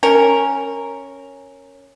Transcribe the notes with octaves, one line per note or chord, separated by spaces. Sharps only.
C#4 A#4